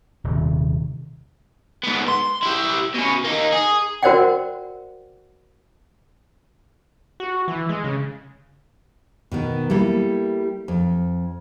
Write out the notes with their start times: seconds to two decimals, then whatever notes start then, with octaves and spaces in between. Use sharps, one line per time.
0.24 D#1 C3 D#3
1.84 G#2 B3
2.08 C6
2.42 E4 G4
2.94 B2 C#4
3.24 A#3 D#4
3.53 G#4
4.03 F#4 A#4 C5 D5 F#5 G5
7.20 F#4
7.48 E3
7.69 G#3
7.84 C#3
9.31 B2 D#3 B3
9.70 G3 A#3 E4 A4
10.68 F2